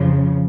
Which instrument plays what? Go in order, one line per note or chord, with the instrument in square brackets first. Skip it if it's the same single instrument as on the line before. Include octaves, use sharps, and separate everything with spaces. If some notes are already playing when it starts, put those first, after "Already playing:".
Already playing: [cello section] F2 C#3 F3